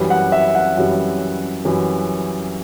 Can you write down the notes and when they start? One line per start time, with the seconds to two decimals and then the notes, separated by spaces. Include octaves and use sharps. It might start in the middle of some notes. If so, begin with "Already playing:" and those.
Already playing: F#2 E3 G3
0.10 F#5
0.32 E5
0.55 F#5
0.77 F#2 E3 G3
1.65 F#2 E3 G3